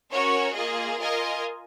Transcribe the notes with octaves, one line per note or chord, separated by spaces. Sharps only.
C#4 F#4 A#4 C#5
A#3 F4 G#4 D#5
F4 A#4 D#5 G#5